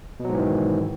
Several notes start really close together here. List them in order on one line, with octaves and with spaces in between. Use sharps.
B2 F#3 G#2 E3 D#3